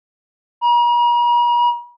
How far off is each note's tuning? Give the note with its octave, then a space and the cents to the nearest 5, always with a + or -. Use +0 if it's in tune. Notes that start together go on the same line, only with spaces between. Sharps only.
A#5 +45